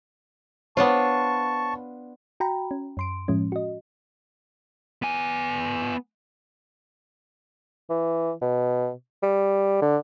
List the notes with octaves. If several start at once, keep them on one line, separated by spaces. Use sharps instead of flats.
B3 D4 F4 C5 C#5 A5 C#6
F#4 G5 A#5 B5
C#4
F#2 C6 D7
A2 F3 G#3 C#4
F#4 D#5
B3 G#5
E3
B2
G3
D3